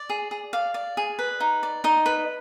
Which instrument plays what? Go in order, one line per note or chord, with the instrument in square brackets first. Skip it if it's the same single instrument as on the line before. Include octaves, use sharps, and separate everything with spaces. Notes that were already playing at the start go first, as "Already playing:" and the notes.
Already playing: [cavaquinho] D5
G#4
G#4
D5 F5
D5
G#4
B4
D#4
D5
D#4 D#5
B4